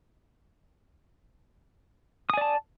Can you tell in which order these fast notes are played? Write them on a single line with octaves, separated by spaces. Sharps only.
D#6 G#5 D5 A5